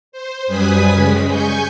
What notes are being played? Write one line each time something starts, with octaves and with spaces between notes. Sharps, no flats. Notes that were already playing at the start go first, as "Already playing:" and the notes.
C5
F#2 G3 B4 G#5 D#6 B6
C#3 G#3
G#5 C#6 G6